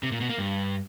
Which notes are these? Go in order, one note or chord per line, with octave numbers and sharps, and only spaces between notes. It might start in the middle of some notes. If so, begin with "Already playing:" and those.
C3
A#2
B2
A#3
G2